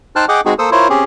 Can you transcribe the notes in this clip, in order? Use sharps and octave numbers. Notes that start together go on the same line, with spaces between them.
D#4 C5 G5 A5 F6 F#6
G#4 D#5 F#5 G5 D6
G#3 C4 D#4 F#4 G#4
A#3 A4 C5 D#6 E6
E4 F4 A#4 C5 C#5
C4 C#4 G4 G#4